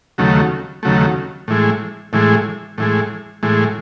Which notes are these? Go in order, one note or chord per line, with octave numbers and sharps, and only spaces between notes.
D#2 C#3 F#3 A3
D#2 C#3 F#3 A3
A2 E3 G#3
A2 E3 G#3
A2 E3 G#3
A2 E3 G#3